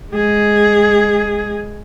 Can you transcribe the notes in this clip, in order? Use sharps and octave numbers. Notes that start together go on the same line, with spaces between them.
G#3 G#4